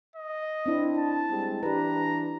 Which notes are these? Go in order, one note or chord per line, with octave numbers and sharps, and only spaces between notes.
D#5
C4 D4 E4
A5
G3 G#3 C4
E3 D4 G4 B4 A#5